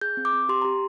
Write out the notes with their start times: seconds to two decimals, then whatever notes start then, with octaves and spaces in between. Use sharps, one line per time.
0.01 G#4 G6
0.17 C4
0.25 D6
0.33 C4
0.49 G4 C6
0.62 G4 A#5